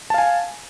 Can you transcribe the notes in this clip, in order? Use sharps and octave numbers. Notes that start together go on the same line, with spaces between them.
F5 G#5 A5